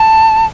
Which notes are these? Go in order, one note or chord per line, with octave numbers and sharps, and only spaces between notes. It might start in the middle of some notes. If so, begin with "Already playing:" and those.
Already playing: A5